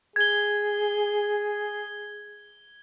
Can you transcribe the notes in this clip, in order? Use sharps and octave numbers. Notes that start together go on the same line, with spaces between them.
G#4 G#6 G7